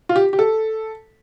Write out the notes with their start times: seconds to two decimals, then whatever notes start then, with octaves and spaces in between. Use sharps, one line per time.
0.09 F4
0.16 G4
0.33 G4
0.39 A4